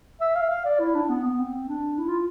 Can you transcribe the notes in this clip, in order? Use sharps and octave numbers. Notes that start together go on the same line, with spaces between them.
E5
F5
F5
D5
E4
D4
B3
B3
C4
D4
E4
F4